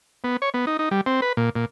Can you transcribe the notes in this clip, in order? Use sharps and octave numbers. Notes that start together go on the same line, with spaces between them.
B3
C#5
B3
D#4
D#4
G3
C4
B4
A#2
A#2